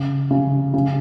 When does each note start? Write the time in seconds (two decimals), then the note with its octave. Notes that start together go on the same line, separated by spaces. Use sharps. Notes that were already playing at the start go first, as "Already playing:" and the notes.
Already playing: C#3
0.31 C#3
0.74 C#3